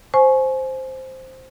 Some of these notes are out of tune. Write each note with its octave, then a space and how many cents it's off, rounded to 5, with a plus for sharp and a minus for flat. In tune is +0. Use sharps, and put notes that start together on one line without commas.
C5 +0 G#5 +30 C#6 -10